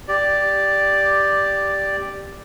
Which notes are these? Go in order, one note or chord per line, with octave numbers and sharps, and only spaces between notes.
G4 D5